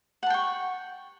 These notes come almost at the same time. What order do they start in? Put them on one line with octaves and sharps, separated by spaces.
F#5 A5 G5 C#6